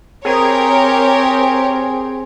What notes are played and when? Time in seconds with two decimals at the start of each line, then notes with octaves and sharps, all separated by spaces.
0.25 C4 G4 G#4 A#4 C#5